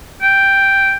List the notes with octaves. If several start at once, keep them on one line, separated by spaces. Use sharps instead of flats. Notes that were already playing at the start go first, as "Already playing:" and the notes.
G5